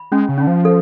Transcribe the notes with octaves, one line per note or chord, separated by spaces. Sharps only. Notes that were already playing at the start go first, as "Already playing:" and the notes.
Already playing: B5
G#3 C#4
C#3
D3 C#4
F3
A4